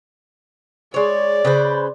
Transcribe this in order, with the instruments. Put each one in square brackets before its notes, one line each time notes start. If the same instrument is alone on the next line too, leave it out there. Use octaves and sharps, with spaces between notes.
[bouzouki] G#3 C#5 [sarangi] D5
[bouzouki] C#3 B4 C5